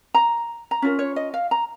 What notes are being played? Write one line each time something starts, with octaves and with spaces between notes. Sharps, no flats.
A#5
A#5
C#4 F4 A#4
C#5
D#5
F5
A#5